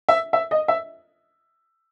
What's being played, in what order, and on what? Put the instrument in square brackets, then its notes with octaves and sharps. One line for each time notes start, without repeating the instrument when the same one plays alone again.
[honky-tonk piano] E5
E5
D#5
E5